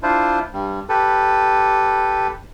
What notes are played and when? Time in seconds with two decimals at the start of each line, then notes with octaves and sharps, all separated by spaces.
0.03 D4 E4 F4 C5
0.53 G2 G3
0.89 G4 A4 B4